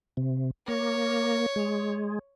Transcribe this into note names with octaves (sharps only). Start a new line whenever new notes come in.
C3
A#3 C#5
G#3